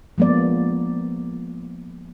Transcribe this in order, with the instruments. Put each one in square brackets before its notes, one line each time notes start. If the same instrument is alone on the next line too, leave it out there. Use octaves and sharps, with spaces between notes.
[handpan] F3 G#3 A#3 B3 D5